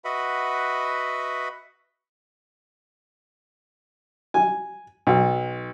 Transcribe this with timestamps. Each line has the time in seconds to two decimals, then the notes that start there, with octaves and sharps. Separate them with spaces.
0.05 F#4 B4 D#5 E5 F#5 B5
4.34 G#5
5.07 B1